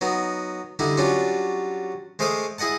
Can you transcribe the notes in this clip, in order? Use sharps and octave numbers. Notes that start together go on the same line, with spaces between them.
F#3 B3 D#4
D3 G3 D#4 E4
F#3 G3 C#4 D4 F4 F#4
G#3 A3 C5 F5 D6 D#6
E4 G#4 D#5 F#5 A5